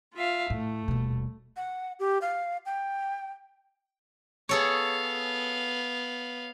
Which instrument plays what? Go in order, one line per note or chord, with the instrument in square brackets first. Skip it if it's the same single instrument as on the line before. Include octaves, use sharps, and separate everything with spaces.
[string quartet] F4 E5 F5
[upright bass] A2 [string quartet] A3
[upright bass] D#1 B2
[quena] F#5
G4
F5
G5
[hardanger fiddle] B3 F5 [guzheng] G#4 A4 C#5